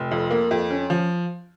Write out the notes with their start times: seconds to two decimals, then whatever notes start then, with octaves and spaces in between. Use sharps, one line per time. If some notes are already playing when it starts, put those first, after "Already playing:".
Already playing: F1
0.11 F2
0.31 A#3
0.51 F2
0.71 C#4
0.90 F3